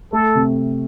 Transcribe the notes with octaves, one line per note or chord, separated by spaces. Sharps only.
A3 A4
C3